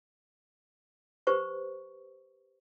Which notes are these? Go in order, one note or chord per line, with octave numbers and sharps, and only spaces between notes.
G4 B4 C5 C#6